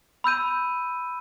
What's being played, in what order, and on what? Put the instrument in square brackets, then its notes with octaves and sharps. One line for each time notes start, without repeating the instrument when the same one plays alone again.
[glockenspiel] B5 E6 G6 D#7